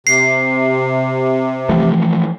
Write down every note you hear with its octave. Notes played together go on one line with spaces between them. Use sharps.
C3 C7
E3 F3 A3